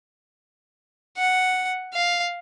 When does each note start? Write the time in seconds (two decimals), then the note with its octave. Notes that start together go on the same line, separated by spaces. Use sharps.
1.17 F#5
1.94 F5